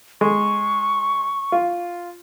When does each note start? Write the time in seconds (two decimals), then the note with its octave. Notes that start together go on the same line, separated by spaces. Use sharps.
0.21 G#3 C#6
1.52 F4